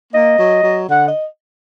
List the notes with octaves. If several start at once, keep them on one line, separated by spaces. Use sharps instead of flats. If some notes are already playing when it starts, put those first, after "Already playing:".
A#3 D#5
F#3
F#3
D3 F#5
D#5